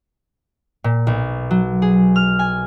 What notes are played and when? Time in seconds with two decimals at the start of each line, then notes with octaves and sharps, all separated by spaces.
0.84 A#2
1.07 B1
1.51 F#3
1.82 G#4
2.16 F6
2.39 G#5